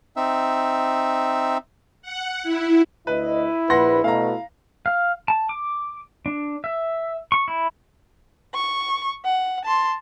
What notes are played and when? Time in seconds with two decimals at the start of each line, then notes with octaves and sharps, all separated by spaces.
0.17 C4 D#4 E5
2.02 F#5
2.43 E4
3.07 D2 E4 B4 D#5
3.70 A#1 B4 F#5 C6 A#6
4.04 B2 A3 F5 A#5
4.86 F5
5.28 A5
5.49 D6
6.26 D4
6.64 E5
7.32 C#6
7.48 E4
8.54 C#6
9.25 F#5
9.65 A5 C6